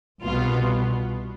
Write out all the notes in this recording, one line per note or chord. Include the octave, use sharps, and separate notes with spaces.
C2 B2 B3 F4